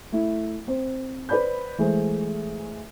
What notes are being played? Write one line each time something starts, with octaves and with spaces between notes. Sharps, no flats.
A3 E4
C4 C5
B4 C5 D5 B5 G6
E3 G#3 A3 C5